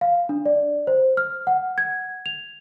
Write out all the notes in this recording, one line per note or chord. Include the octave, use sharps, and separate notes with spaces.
F5
D4
D5
C5
F6
F#5
G#6
F7